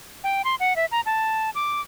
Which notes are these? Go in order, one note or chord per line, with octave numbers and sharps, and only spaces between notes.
G5
C6
F#5
E5
A#5
A5
D6